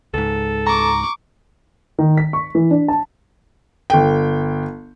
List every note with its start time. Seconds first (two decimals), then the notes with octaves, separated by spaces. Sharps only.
0.14 C#2 G#2 A4
0.67 A#5 C#6 D6
1.98 D#3
2.17 B6
2.33 C#6
2.55 E3
2.71 D4
2.88 A5
3.90 G1 G5